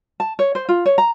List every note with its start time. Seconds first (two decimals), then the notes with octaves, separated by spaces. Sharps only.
0.20 A5
0.39 C#5
0.55 C5
0.69 F4
0.86 C#5
0.98 A#5